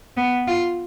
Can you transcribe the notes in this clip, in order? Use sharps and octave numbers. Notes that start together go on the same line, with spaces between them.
B3
F4